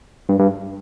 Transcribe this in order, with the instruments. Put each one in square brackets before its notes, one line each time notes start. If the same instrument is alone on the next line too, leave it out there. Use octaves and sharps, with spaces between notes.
[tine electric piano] G2
G2